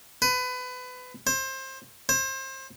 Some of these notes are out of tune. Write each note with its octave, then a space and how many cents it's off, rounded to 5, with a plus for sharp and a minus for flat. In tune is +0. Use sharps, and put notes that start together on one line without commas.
B4 +25
C5 +25
C5 +30